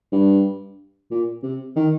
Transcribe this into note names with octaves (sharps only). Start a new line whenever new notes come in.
G2
A#2
C3
D#3